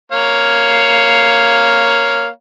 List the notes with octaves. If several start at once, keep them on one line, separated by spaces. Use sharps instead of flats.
A#3 C#5 F5